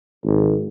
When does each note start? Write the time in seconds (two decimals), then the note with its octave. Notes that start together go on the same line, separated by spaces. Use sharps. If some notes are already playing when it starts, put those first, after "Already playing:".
0.24 G#1